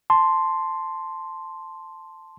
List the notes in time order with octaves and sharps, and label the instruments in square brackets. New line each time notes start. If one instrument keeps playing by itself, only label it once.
[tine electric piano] A5 C6